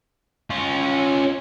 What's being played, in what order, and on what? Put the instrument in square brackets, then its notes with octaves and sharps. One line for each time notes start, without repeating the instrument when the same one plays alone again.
[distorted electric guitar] C#4 F4